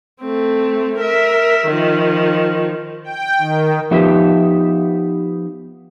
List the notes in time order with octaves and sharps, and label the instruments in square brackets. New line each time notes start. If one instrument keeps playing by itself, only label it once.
[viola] A3 C4
A#4 E5
D#3 F3
[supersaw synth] G5
D#3
[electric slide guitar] F3 B3 D#4 G4 B4 E5